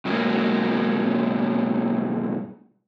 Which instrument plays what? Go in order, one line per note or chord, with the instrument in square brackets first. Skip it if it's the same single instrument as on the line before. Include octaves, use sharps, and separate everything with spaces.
[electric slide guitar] G2 B2 F#3 G#3 A#3